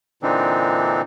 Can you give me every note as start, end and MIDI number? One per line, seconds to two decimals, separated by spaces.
0.23 1.02 46
0.23 1.02 50
0.23 1.02 52
0.23 1.02 60
0.23 1.02 62
0.23 1.02 63